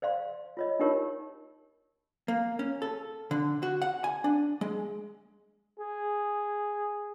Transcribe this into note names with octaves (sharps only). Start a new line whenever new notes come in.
C5 D5 F5 C6
F4 C#5 D#5
D4 D#4 F4 G4 A#4 C#5
A#3
C#4
A4
D3
F#4
F#5
G#5
D4
G#3
G#4